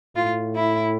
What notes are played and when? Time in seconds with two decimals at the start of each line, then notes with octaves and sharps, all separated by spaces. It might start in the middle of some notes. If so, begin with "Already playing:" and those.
0.16 A2 F4
0.55 E4